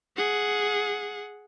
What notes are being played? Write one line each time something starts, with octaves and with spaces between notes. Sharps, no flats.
G#4 F#5